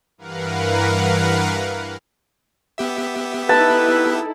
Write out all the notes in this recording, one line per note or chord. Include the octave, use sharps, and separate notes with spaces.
G2 E3 A#4 B4 F5 F#5
B3 G4 E5
D#4 E4 A4 B4 A5